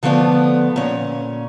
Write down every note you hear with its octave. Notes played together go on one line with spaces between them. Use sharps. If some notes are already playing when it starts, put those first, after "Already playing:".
D3 F3 A3 B3 D4
A#2 C#4